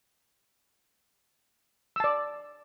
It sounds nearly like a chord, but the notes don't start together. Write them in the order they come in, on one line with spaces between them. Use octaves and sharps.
E6 A5 D5